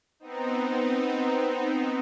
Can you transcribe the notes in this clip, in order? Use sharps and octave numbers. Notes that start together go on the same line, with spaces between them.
B3 C4 D#4